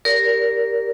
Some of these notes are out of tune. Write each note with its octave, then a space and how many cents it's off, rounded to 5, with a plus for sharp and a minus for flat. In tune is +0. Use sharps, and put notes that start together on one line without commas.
G4 +5 A#4 +0 D5 -40